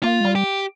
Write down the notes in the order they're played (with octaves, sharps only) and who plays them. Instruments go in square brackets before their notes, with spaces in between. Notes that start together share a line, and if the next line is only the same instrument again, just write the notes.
[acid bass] A#3 [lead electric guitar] F4
[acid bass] G#3
G3
[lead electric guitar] G4